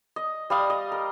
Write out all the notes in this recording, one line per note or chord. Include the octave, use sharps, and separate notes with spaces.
D#5
G3 F5 D#6
D#5
A#4